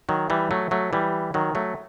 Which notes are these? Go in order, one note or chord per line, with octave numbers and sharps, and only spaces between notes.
D#3 F#3
E3 G3
F#3 A3
F#3 A3
E3 G3
D#3 F#3
F#3 A3